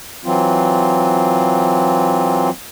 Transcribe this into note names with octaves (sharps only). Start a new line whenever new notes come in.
E3 F#3 C4 F4